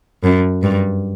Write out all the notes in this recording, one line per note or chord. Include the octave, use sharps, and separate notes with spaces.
F#2
G2